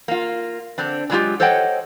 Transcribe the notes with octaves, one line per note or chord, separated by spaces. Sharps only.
A#3 F4
D3 C4 D4
D3 F#3 G#3 E4 F4 G4
A4 C5 C#5 D#5 F#5 G5